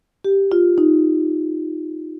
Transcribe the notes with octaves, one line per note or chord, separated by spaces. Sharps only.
G4
F4
D#4